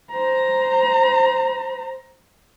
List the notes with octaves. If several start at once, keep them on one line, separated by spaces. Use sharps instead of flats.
C5 A#5